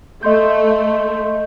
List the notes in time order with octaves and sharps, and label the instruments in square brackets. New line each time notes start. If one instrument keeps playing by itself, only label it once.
[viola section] A3 [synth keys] D#5 C6 G6